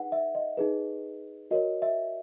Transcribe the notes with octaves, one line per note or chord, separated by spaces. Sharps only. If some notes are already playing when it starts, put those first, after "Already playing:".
Already playing: D#4 G#4 B4 F#5
E5
D#5
D#4 G#4 B4
F#4 A#4 C#5 D#5
E5